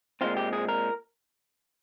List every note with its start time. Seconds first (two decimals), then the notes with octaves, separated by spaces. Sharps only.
0.21 A#2 G#3 C4 F4
0.37 G4
0.53 G#4
0.69 A#4